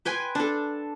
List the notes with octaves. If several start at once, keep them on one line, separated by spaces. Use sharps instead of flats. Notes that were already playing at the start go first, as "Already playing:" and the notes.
B4 G5 G#5 C6
D4 A4